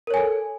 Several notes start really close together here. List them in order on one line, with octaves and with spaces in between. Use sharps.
A#4 C#5 G#5 A4